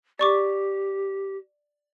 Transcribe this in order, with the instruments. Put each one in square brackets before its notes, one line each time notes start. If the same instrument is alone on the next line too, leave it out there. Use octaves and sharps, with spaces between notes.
[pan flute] G4 [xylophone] D5 C#6 D6